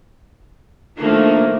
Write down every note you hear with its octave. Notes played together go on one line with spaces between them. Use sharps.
D#3 F3 A3 A#3 D4